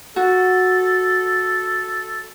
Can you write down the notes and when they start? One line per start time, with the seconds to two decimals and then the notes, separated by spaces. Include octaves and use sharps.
0.16 F#4 A4